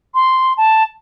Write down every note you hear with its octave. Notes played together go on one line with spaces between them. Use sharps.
C6
A5